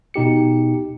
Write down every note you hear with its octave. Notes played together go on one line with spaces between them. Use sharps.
B2 D#4 G4 C#7